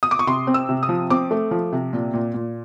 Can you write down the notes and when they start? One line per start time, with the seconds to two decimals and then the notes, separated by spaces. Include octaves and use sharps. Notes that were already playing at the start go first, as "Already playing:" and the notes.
0.03 D#6
0.11 D6
0.19 C#6
0.27 C3 C6
0.47 C4
0.54 E6
0.69 C3
0.83 D#6
0.89 F3
1.10 C4 D6
1.31 A3
1.51 F3
1.72 C3
1.93 A#2
2.14 A#2
2.34 A#2